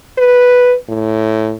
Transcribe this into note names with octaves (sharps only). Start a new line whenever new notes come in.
B4
A2